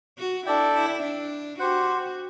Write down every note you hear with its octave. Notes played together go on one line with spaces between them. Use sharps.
F#4
D4 E4 A4 D5 G5
E4
D4
F#4 G4 C5 F#5